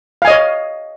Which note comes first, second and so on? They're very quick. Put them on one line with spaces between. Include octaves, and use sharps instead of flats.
F5 G#5 D#5 C#5